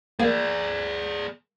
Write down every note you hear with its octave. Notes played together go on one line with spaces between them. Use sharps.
A#3 G#4 D5